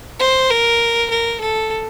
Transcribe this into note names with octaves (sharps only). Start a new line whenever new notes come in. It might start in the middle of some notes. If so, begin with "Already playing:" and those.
C5
A#4
A#4
A4